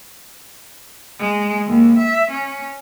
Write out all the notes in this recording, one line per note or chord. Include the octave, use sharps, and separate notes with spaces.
G#3
D#2
E5
C#4